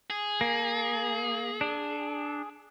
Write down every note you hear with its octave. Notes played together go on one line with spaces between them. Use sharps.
G#4
A#3
D4